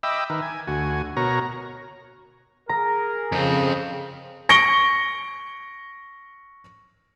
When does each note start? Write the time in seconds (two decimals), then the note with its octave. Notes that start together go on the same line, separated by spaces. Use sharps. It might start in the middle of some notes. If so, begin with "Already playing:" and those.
0.03 D#5 E5 G5 B5 D6 E6
0.30 D#3 A#4 B4
0.42 G#5
0.67 D2 F#4 G#5
1.17 B2 F#4 A#4 C#5 A#5
2.69 G#4 A#4 A#5
3.32 F2 C#3 C4
4.49 C#6 A#6 C#7 D7 G7